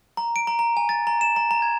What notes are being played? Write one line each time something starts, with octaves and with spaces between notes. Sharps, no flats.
A#5
D7
A#5
A#5
G#5
A6
A#5
E7
A#5
A#5
G#6